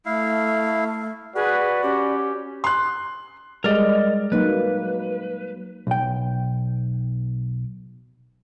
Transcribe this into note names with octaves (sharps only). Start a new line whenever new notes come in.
A3 E4 F5
F#4 G#4 B4 D5 B5
C#4 G4
C6 F#6
G3 G#3 A#4 D5 D#5
F#3 A#3 D#4 B4
B1 G5